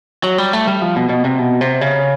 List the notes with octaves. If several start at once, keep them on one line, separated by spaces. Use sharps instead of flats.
F#3
G3
A3
G3
F3
B2
B2
C3
B2
C3
C#3